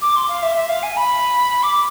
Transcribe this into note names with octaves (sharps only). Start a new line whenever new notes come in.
D6
C6
F5
E5
E5
F5
G#5
B5
D6